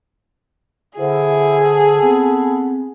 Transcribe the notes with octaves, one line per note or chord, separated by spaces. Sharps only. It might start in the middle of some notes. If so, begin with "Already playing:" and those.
D3 E4 G#4 C5 F#5
A4
B3 C4